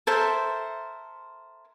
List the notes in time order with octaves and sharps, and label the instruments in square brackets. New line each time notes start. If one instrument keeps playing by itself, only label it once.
[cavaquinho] A4 A#4 C5 E5